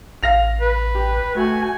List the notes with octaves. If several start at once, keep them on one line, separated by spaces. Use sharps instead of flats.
A1 F5 A#6 F7
B4
G4
A3 F#4 G#5